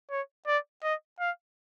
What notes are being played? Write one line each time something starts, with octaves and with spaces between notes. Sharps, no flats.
C#5
D5
D#5
F5